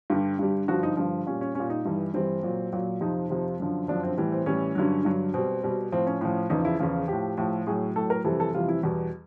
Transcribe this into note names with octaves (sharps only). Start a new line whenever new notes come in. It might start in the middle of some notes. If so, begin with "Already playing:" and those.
G2 D3 G3 G4
G2 D3 G3
G2 D3 F3 F#4
D#4
G2 D3 F3
A#2 G3 C#4
C#4
A#2 G3 C#4
D#4
G2 E3 G3
G2 E3 G3 C4
A#2 F#3
A#2 F#3
F2 C3 F3 D#4
F2 C3 F3
F#2 D3 F3
F#2 D3 F3 D4
C4
A2 E3 G3
C4
A2 E3 G3 C#4
G2 D3 F#3
G2 D3 F#3
B2 G3 C4
B2 G3
A2 F3 C4
C#4
A2 F3
E2 C#3 F3 D#4
E4
E2 C#3 F3 F4
A2 F3 G4
A2 F3
A2 F#3 G#4
A2 F#3 A4
A#4
F2 C3 E3 G3 A4
A4
F2 C3 E3 G3 F4
E4
E2 B2 G3